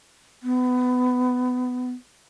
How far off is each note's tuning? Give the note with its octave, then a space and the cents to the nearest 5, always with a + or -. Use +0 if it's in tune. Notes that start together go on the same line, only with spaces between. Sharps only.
B3 +20